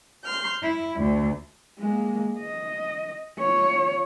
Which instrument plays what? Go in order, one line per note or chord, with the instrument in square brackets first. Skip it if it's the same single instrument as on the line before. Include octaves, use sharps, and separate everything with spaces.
[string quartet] C6 F6 G6
E4
D2
[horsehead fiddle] G#3 A#3
D#5
F4 C#5